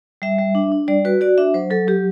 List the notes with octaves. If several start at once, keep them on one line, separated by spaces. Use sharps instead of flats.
G3 E5
G3
D4
D4
G3 D5
F#4 B4
F#4 D5
D4 E5
F#3 C5
F#3 A4
F#3 G4